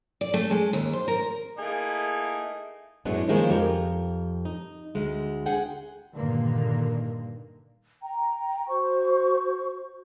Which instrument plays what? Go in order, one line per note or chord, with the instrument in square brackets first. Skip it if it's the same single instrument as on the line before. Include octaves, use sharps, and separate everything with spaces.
[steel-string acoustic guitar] D5
A3
G#3
D#2
C5
A#4
[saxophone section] A3 A#3 D#4 E4 G#4
[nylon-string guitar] F#2 A2 F#3 G#3 B3 D4
D#3 F3 G3 G#3 A#3 C#4
F2 G4 A#4
D#4
D2 G#3
G#4 F#5 G5
[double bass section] G2 A#2 D3 D#3 A#3
[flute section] G5 A#5
F#4 C5 C#6